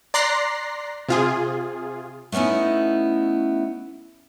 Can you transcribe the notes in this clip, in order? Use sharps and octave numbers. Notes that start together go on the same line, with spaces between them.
D5 A#5 C6 F#6 A#6 C7
C3 F4 G#4
A3 B3 C#4 D#4 E4